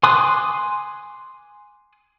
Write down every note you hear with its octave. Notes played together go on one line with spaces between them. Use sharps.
G#5 C6 D6 D#6 F#6